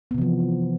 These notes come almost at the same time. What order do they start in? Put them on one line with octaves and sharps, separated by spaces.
B3 C3 E3 F3